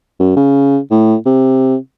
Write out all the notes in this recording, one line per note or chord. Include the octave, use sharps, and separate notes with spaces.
F#2
C#3
A2
C3